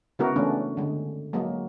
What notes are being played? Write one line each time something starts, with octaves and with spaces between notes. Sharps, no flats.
C#3 G#3 B3 E4 F#4 A#4
C#3 E3 A3 B3 C#4 D4
D3 G#3
F#3 G#3 A#3